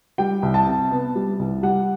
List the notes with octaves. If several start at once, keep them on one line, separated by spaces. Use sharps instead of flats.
G3 G5
C2
A5
C3
B3
G3
C2
G3 F#5